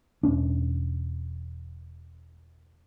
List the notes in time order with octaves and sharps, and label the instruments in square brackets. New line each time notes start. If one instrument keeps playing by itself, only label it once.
[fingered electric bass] E1 C#4 D4